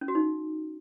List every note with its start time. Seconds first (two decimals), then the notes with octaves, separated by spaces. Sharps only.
0.01 C#4
0.08 F#4
0.15 D#4